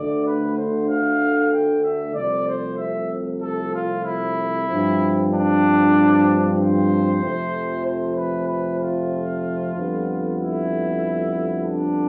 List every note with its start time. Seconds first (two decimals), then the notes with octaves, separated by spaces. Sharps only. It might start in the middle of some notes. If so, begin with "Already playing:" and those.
Already playing: D2 D3 A3 D5
0.25 B4
0.57 C5
0.88 F5
1.52 G5
1.83 E5
2.15 C2 C3 F3 A3 D5
2.47 C5
2.78 E5
3.41 A4
3.73 F4
4.05 E4
4.68 G2 F3 C4
5.31 D4
6.57 C5
7.20 F2 C3 F3 A3 C4
7.84 C5
8.15 B4
8.47 B4
8.79 F4
9.73 F2 D3 G3 B3
10.37 E4
11.63 D4